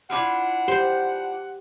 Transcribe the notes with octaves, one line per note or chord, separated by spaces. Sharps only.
D4 E4 F4 F#5
G4 C5